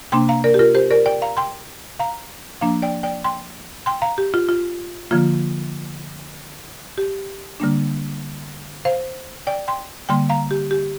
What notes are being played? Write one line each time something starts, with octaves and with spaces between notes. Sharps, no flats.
C3 A#3 D4 G5 C6
F5 A#5
A#4 D5
G4
F4 A#4
G4 C5
A#4 D5
D5 G5
F5 A#5
G5 C6
F5 A#5
F3 A#3 D4 F5 A#5
D5 G5
D5 G5
G5 C6
G5 C6
F5 A#5
G4
F4
F4
D3 F3 A#3 F4
G4
D3 G3 A#3 D4
C5 F5
D5 G5
G5 C6
D3 G3 A#3 G5 C6
F5 A#5
G4
G4